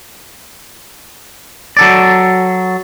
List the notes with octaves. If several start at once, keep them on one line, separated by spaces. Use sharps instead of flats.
F#3 A4 D5